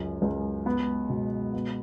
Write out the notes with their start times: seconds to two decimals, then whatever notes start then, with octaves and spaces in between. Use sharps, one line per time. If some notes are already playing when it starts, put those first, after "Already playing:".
Already playing: C#2 F#2
0.22 C#2
0.66 B3
1.09 B2
1.54 B3